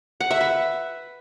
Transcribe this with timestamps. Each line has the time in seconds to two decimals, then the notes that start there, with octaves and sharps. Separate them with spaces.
0.20 F#5
0.31 E5
0.41 B4